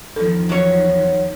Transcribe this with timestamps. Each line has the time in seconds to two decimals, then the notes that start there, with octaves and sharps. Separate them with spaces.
0.16 E2 D#3 F3 A4
0.49 F#3 C#5